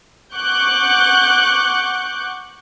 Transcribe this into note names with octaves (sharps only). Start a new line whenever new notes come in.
F#5 C#6 D6 F#6 G6